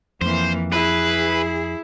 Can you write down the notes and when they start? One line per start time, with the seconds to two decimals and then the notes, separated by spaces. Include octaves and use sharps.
0.21 F2 E3 A#3 C5
0.72 E4 G#4 B4